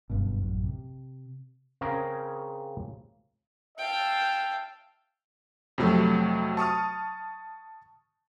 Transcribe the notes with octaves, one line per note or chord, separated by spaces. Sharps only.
F#1 G2 B2
A1 F#2
C3
C#3 C4 C#4 G#4 A#4
E5 F5 G5 A5
F2 C3 F#3 A3
A5 C#6 D#6 F6